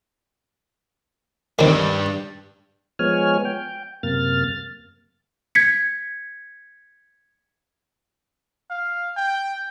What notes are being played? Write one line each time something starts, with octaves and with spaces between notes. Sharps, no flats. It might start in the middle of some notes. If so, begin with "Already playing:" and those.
G2 D#3 G3 C4
F3 G#3 B3 C#5 G#5 F6
G5
F#2 C3 A#3 F6 A6
G#6 B6 C#7
F5
G5